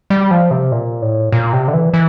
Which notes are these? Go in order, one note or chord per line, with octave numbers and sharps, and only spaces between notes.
G3
F3
C3
A#2
A2
A#2
C3
D3
E3
E3